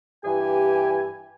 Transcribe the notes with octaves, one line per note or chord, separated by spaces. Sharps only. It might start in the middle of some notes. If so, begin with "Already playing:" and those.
G2 E3 G4 G#5